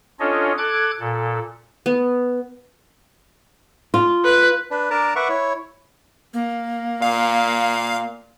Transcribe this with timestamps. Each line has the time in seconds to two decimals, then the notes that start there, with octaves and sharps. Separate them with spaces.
0.20 C#4 D4 F4 A4 C#5 D#5
0.58 A4 D6 F#6 G#6
1.00 A#2 A4
1.86 B3
3.94 F4
4.25 B4
4.71 D4 B4
4.91 D4 A#4 A5 A#5 D6
5.16 B4 E5 F#5 C#6 D6
5.29 E4 C#5
6.34 A#3
7.02 A#2 F5